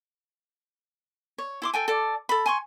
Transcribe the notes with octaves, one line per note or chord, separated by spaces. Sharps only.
C#5
E4 C6 D6
A4 G5 G#5
A4 D5
A4 B5
G#5 C6 C#6